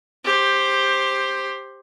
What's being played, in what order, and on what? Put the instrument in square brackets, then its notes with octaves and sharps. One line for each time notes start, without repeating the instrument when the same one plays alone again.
[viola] G4 C5